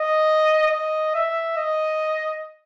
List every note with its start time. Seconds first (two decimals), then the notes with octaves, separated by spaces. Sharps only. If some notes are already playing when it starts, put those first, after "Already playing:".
Already playing: D#5
0.71 D#5
1.15 E5
1.57 D#5